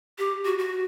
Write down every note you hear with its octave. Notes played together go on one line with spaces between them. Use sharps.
G4
F#4
F#4